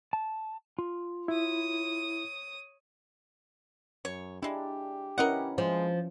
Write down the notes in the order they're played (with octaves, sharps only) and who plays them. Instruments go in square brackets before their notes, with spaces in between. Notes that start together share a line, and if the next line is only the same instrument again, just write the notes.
[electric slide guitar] A5
F4
[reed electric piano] E4 [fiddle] C#5 D#6
[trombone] F#2 [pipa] C#5
[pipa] G#3 E4 [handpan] D4 [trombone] G4
[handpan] C#4 E4 B4 [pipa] A#4 D#5 F#5
[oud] F3 [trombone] G#3